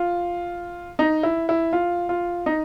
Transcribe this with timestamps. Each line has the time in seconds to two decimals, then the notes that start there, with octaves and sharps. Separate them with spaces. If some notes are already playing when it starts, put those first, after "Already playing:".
Already playing: F4
0.99 D#4
1.23 E4
1.49 E4
1.73 F4
2.09 F4
2.46 D#4